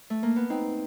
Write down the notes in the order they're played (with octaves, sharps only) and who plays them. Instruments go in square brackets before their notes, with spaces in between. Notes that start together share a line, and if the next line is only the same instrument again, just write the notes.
[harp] A3
A#3
B3
[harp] C4 [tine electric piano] D#4